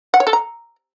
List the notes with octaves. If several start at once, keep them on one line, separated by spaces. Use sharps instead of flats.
F#5
C#5
A4
A#5